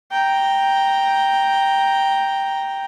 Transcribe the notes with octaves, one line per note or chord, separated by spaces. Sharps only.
G5 A#5